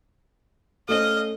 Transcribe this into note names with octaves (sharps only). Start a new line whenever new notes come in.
A3 C#4 C5 D#5 F5